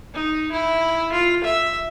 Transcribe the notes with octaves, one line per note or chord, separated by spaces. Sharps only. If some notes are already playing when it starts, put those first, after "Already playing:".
D#4
E4
F4
E5